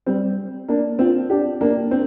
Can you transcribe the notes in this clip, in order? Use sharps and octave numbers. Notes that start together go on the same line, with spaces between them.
G3 C4
A#3 D4
C4 F4
D4 G4
A#3 D4
C4